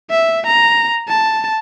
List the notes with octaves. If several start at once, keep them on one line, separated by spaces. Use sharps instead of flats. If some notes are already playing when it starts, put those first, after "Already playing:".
E5
A#5
A5